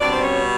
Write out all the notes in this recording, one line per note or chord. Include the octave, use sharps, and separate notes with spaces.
B2 G3 C4 D4 D5
C5
C#4 C#5